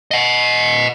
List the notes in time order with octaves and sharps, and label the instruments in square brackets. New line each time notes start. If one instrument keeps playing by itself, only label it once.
[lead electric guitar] D#5 F#5